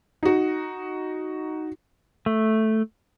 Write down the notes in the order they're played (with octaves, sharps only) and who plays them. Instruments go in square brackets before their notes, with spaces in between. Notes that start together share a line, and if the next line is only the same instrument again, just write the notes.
[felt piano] D#4 F#4
[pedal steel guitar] A3